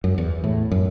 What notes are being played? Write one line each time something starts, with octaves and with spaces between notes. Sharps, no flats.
F#2
E2
A2
F#2